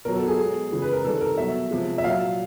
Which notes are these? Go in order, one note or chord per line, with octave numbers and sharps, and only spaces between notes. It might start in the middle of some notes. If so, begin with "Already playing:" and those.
B2 F#3 A#4
A4
G#4
B2 G#3
C#3 E3 G#3
B4
A#4
C3 D#3 G3 A4
A#4
B2 F#3 E5
C3 F3 G#3
E5
A#2 F#3 F5